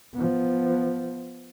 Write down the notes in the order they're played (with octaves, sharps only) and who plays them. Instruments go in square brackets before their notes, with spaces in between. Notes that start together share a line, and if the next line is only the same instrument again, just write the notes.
[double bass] F3 B3